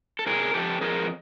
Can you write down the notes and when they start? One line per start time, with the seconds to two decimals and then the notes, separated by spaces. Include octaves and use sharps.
0.19 A4
0.26 C3 G#4 A#4
0.54 F2 G4 A4
0.81 F2 G#4 A#4